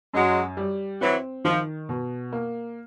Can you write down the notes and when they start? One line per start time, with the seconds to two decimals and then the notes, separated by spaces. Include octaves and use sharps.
0.13 F#2 F#3 G#3
0.57 G3
1.01 E3 F#3 C4
1.45 D#3 F3
1.89 B2
2.33 A#3